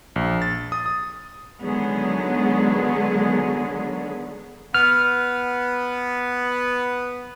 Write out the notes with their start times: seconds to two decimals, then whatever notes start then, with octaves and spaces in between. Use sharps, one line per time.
0.16 A#1
0.42 A6
0.72 D#6
0.86 D#6
1.63 D3 D#3 F#3 G#3 B3 G#4
4.75 B3 F6